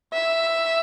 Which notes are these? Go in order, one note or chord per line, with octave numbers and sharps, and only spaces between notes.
E5